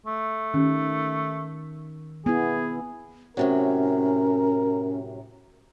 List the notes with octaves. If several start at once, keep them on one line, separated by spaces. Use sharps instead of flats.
A3
D#3 C#4 G4
B3 E4 G#4
A2 C3 F#3 C#4 A#4